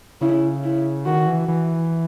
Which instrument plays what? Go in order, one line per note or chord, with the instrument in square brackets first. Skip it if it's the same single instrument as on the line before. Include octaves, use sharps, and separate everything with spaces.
[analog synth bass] C#3 [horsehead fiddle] E4
[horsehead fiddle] E4
[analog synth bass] D#3 [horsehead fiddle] F#4
[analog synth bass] E3
E3